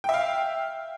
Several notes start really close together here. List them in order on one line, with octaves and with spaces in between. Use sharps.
G5 E5 F5